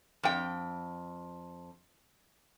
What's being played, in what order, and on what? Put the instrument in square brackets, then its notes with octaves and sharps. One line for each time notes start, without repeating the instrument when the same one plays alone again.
[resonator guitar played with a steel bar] F2 G5